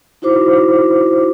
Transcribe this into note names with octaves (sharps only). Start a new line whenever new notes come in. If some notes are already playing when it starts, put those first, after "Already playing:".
D#4 E4 F#4 C5 D6